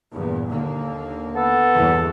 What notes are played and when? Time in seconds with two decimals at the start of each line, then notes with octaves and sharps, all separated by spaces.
0.13 E2 G2 A#2
0.50 D#2 D3 A#3
1.35 B3 A4
1.74 E2 G2 E3